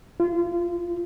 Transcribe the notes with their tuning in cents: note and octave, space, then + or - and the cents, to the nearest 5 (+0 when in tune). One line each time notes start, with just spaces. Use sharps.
F4 -30